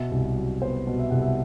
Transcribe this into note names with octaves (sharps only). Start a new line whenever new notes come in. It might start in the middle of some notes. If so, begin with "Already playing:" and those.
Already playing: B2 E5
C2
F#3
B3 C5
B2
E5
C2 F#5
E5